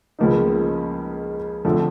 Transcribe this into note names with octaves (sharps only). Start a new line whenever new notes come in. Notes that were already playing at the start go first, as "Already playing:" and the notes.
C#2 C#3 F3 A#3 D#4
F2 D3 F3 A3